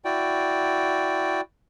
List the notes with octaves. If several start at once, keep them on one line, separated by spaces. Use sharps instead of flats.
E4 F#4 D5 G5